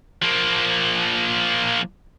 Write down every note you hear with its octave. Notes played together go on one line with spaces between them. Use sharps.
F3 A#3